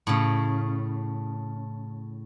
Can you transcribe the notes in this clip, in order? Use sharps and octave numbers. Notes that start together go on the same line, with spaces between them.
A2 C#3